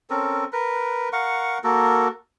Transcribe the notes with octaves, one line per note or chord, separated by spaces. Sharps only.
C4 C#4 A4 A#4
A#4 B4
A#4 F5 F#5 C#6
A#3 F#4 A4 A#4